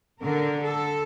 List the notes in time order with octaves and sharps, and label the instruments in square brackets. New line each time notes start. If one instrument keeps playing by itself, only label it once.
[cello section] D3 A#4
A4